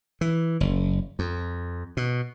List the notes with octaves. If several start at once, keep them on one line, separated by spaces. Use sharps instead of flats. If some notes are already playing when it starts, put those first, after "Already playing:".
E3
F#1
F2
B2